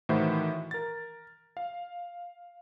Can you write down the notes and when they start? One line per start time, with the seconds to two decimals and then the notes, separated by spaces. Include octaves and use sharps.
0.09 A2 D#3 E3 F#4 C5 E5
0.71 A#4 A6
1.57 F5